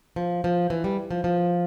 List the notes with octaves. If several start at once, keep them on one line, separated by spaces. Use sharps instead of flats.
F3
F3
E3
G3
F3
F3